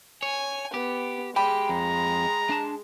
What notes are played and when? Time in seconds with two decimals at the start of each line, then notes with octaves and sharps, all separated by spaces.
0.23 C#5 G#5
0.74 B3 G4
1.36 G#3 G4 G5 B5
1.69 F2 A#5
2.50 D4 A5